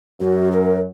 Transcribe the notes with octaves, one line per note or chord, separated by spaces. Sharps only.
F#2 F#4
A#4